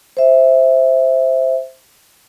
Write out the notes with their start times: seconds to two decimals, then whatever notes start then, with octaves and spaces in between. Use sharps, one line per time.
0.17 C5 E5